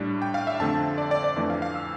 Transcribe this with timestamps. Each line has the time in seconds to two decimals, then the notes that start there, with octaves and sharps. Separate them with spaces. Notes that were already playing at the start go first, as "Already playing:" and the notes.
Already playing: A2 G3 D4
0.22 G5
0.34 F5
0.47 E5
0.60 F2 D3 A3 C4 A5
0.98 D5
1.11 D5
1.24 D5
1.36 F2 E3 A3 D4
1.50 F5
1.62 F5
1.75 E6